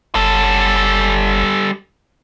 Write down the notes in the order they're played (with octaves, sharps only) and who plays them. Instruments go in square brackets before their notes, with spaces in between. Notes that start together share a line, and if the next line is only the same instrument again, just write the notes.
[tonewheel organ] F#1 [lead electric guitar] G3 A4